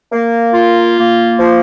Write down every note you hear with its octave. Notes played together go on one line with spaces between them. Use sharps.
A#3
F4
A#3
F3